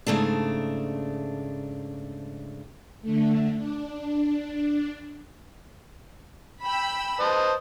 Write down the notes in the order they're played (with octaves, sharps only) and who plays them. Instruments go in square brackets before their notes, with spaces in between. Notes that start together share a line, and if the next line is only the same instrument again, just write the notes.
[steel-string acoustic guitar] G#2 C#3 A3 D4
[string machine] D3 A3
D4
[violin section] G5 B5 E6
[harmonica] B4 C5 D#5 [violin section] A5